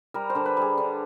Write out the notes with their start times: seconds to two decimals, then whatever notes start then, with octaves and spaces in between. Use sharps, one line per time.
0.14 G3 A#4
0.30 C5
0.35 D3
0.45 B4
0.57 G3 G#4
0.78 D3